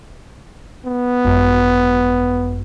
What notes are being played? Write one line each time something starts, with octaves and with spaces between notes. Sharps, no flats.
B3
G#1 F#2